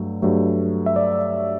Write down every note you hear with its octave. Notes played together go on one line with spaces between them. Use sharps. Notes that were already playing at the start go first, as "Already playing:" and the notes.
Already playing: G2 F#3 A3
G2 F#3 A3
E5
D5